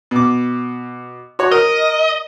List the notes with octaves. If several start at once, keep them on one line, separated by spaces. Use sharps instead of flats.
B2 D6
F#4 C#5
A#4 D#5